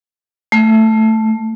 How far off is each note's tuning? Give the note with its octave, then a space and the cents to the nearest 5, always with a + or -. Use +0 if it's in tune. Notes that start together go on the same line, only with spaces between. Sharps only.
A3 +5